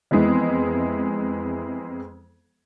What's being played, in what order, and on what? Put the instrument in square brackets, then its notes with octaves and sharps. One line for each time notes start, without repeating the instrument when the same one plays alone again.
[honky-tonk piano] F2 E3 G#3 B3